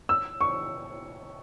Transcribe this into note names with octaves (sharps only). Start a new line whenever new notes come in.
E6
C#6